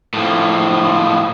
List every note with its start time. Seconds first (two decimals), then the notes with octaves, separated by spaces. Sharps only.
0.14 A2 F3